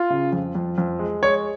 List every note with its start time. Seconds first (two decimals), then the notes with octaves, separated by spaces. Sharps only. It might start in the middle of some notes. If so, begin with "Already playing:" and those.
Already playing: F4
0.10 C#3
0.32 F2
0.55 F2
0.78 F2
0.99 G#3
1.23 G#3 C#5